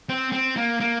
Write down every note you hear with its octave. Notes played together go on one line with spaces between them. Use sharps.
C4
C4
A#3
A#3